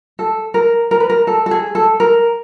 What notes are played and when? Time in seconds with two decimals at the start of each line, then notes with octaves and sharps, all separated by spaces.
0.19 A4
0.54 A#4
0.91 A#4
1.00 B4
1.10 A#4
1.27 A4
1.46 A4
1.51 G#4
1.75 A4
2.00 A#4